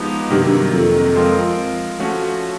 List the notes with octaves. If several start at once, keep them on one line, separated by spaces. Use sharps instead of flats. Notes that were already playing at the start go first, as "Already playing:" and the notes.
Already playing: F3 G#3 B3 D#4 G4
G2 C3 D#3 F#3 A#3
F2
F3 G#3 C4 F4 A#4
F3 A3 C#4 F#4